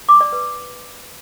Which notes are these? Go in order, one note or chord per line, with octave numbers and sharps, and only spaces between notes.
D6
D5
B4